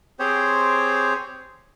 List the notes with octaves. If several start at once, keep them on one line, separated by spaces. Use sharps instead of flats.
C4 G4 G#4 C5 C#5